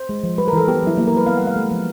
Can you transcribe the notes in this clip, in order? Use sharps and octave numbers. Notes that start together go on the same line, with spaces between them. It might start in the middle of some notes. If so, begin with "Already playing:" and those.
Already playing: C5
G#3
F3
G3 B4
A#4
E3 A4
B3 G4
F#3 E4
A#3 E4
A#4
G3 B4
B3 F5
F#5
G#3 F5
A3
F3